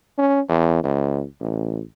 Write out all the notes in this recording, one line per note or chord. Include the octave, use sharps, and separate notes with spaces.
C#4
E2
C#2
A1